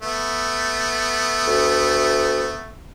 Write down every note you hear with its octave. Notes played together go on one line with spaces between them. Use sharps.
A3 B3
D2